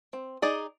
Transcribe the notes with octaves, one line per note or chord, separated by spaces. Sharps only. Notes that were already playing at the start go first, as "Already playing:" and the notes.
C4
D#4 G#4 D5